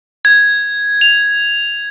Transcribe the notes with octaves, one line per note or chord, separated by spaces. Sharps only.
G#6
F7